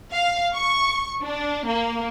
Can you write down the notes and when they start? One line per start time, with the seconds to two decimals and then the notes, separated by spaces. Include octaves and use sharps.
0.12 F5
0.54 C#6
1.22 D4
1.66 A#3